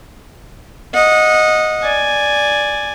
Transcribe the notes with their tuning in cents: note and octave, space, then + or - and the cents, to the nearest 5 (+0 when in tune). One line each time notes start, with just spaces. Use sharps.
D#5 +0 F#5 -25
D5 +0 G#5 +0